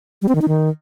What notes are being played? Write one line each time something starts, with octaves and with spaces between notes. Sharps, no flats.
G3
C4
D#3
D#4
D#3